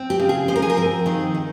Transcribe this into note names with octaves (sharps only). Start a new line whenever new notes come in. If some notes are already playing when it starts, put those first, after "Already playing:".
Already playing: C4
G4
C#3
G#4
F3 C5
A#4
G#4
A#4
C4
D#3 G#4
D#3